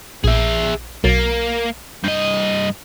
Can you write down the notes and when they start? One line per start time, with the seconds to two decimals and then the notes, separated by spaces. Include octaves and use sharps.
0.24 A#1 G#4 E5
1.04 B1 F#3 A#3 A6
2.04 G2 D#5 G6